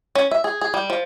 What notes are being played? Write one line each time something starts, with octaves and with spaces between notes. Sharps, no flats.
C#4
E5
G#4
G#4
G3
F3